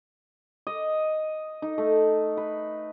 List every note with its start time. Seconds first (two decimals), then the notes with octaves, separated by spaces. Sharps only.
0.67 D#5
1.62 D#4
1.78 A3
2.37 B4